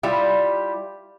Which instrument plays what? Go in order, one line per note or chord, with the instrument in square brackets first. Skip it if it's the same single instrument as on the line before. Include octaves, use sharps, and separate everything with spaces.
[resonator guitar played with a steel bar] G3 E4 F4 G4